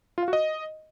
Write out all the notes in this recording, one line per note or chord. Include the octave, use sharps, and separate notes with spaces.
F4
F5
F#4
D#5